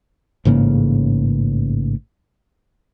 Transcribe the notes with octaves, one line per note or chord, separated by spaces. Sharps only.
A1 G#2 C#3 A#3